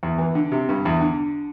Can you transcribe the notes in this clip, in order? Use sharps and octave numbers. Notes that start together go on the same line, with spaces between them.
E2
E3
D3
C3
G2
E2
D3